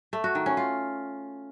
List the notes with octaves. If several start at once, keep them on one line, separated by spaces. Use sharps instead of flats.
A3
F#4
D#3
C#4
F4